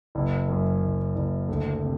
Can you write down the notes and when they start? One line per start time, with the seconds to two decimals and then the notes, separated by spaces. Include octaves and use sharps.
0.15 F#1
0.48 F#2
0.82 F#1
1.15 F#1
1.48 D2
1.83 C3